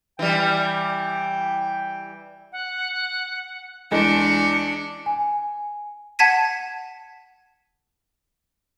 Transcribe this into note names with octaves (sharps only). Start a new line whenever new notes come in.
E3 G3 G5
F#5
E2 G#3 D4 C#7
G#5
F#5 A5 G#6 B6 D#7